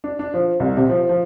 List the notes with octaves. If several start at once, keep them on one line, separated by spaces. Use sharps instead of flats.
D4
D4
F3
C2
C3
F3
F3